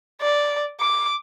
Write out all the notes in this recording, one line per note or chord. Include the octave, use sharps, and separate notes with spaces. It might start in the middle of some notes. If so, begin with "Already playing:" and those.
D5
D6